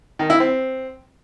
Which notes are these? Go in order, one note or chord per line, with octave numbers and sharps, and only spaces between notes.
D#3
E4
C4